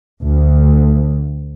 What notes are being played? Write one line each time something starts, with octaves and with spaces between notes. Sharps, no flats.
D2